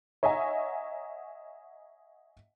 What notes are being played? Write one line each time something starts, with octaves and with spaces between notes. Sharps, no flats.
C#5 D#5 E5 F#5 G#5 A#5